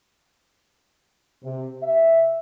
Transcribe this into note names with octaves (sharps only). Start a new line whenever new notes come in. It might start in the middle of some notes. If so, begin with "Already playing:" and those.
C3
E5